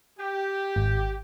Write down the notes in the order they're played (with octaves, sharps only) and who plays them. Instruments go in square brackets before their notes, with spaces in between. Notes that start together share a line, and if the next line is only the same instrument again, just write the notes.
[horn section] G4
[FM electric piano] G#1